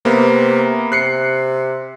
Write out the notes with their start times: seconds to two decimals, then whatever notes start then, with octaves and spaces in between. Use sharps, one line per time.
0.05 C3 A#3 B3
0.92 C3 F#6 C7 C#7